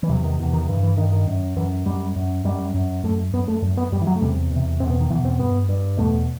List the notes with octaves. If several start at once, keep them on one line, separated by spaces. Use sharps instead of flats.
E3
E2 C3 F#3
D#3
E2 C3
D#3
G2 E3
E3
G2 D#3
D#3
F#2
F#2 E3
F#2 G3
F#2
F#2 G3
F#2
F#2 A3
F#2 B3
A3
F#2
B3
F#2 G3
E3
F#3
A3
E2 C3 G3
E2 C3
E2 B2 C4
B3
D#3
E2 B2 E3
C4
G2 B3
G2
E2 B2 A3